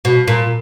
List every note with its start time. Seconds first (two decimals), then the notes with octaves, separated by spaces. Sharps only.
0.05 B2
0.28 A#2